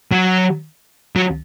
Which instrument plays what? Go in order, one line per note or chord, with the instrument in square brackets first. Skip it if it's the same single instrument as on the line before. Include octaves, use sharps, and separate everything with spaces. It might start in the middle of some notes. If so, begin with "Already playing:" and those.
[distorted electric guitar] F#3
F#3